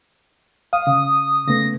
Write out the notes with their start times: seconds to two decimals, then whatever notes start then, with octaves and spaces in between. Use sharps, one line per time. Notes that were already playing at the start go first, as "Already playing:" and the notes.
0.73 F5 D#6
0.87 C#3
1.48 C#3 A3 B3 A#6